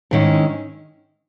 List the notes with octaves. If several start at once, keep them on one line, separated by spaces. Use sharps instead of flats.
G#2 D#3 G#3 C#4 E4